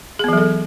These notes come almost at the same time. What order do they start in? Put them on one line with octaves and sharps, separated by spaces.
G#4 B3 E3 F#3 A4